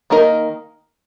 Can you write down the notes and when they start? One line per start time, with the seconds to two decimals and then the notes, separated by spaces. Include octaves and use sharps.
0.10 D#3 A#3 D#4 A#4 D#5